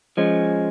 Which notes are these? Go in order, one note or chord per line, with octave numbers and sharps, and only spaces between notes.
F3 G#3 C#4